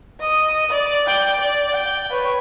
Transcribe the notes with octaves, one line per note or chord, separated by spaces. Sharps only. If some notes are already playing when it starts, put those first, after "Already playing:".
D#5 D#6
D5
D5 G5
D5
G5
B4 C#5